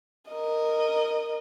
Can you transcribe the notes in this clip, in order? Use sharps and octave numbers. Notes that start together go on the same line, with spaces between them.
A#4 D#5